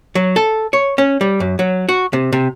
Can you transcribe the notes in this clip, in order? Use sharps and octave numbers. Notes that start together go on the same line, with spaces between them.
F#3
A4
C#5
C#4
G3
F#2
F#3
F#4
C3
C3